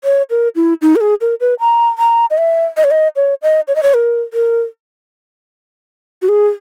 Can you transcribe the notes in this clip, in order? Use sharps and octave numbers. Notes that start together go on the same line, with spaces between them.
C#5
A#4
E4
D#4
A#4
G#4
A#4
B4
A#5
A#5
D#5
E5
D#5
C#5
D#5
C#5
D#5
C#5
D#5
C#5
A#4
A#4
F#4
G#4